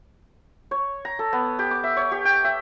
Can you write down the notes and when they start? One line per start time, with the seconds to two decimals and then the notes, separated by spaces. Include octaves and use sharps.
0.71 C#5
1.05 A#5
1.19 A4
1.33 B3
1.59 G4
1.71 D6
1.84 E5
1.97 C#5
2.12 G4
2.25 G5
2.44 E5